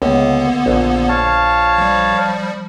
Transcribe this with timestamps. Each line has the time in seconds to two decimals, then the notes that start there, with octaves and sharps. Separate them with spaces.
0.02 C#2 D3 A#3 B3
0.66 A#1
1.09 C#5 F5 A5
1.78 F3 G3